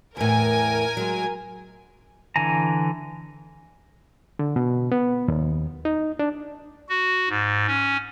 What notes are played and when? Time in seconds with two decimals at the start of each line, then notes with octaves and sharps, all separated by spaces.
0.17 E2 A2 A#4 G#5
0.97 F#3 G#3
2.36 D3 E3 G#5 A#5
4.39 D3
4.56 B2
4.92 B3
5.28 D#2
5.85 D#4
6.19 D4
6.89 F#4
7.29 G#2
7.67 C#4